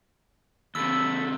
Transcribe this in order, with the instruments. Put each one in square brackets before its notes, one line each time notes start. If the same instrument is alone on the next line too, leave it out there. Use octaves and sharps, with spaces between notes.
[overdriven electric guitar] D#2 C3 [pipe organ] A4 B5 [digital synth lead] E6